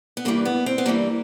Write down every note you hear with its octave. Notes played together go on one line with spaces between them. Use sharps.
B3
G2 E3 G3 A#3
B3
C4
B3
G2 E3 G3 A#3